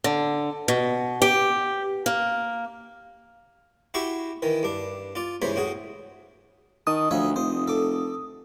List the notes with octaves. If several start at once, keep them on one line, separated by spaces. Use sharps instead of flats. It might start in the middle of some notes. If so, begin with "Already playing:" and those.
D3
B2
G4
A#3
E4 F#4 G4 E5 C6 C#6
D#3 E3
G2 D4
F4 D5
C#2 G2 E3 C5 C#5 B5
A2 F#4 G#4
D#3 A5 D#6
D2 F3 C#5 E5
F1 C5
A4 D6